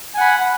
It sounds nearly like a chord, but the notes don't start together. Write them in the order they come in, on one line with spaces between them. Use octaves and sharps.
G#5 F#5 B5